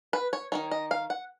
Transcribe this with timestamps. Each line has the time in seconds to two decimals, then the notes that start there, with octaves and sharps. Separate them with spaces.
0.13 B4
0.33 C#5
0.52 D#3 A#3 D#4 C#5
0.71 D#5
0.91 F5
1.10 F#5